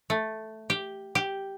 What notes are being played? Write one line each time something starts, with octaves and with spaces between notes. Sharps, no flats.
A3
G4
G4